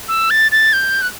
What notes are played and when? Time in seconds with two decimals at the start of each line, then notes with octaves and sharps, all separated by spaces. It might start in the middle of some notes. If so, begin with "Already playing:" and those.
0.08 E6
0.30 A6
0.52 A6
0.73 G6
1.02 F#6